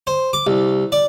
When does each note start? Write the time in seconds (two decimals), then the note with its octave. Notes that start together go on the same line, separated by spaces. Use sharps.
0.07 C5
0.33 D6
0.47 C2
0.92 D5